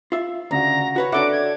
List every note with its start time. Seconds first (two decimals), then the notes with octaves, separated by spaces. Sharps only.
0.12 F4 E5
0.51 D2 C#3 F#4 A#5
0.96 F#4 B4 C#5
1.12 D4 F#4 A4 C#5 E5 F#5 D6
1.32 G#6